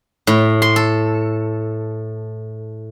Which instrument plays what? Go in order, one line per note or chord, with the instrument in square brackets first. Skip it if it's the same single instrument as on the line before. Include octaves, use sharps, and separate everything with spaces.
[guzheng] A2
C6
A4